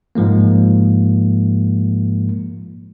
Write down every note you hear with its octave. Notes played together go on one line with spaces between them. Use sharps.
G#2 F3 G#3 A#3